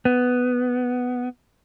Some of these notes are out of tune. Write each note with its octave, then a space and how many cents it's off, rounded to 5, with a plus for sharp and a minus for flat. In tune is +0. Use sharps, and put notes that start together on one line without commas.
B3 +5